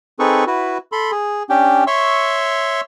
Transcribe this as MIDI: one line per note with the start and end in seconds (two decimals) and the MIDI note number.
0.19 0.44 60
0.19 0.44 63
0.19 0.44 68
0.19 0.44 69
0.19 0.44 71
0.19 0.44 85
0.47 0.78 64
0.47 0.78 66
0.47 0.78 71
0.92 1.11 69
0.92 1.11 83
0.92 1.11 84
1.11 1.43 68
1.49 1.84 61
1.49 1.84 62
1.49 1.84 67
1.49 1.84 79
1.87 2.81 73
1.87 2.81 76
1.87 2.81 84
1.87 2.81 85
1.87 2.81 88